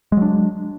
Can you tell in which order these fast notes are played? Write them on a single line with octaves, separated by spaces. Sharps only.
G#3 F#3 D4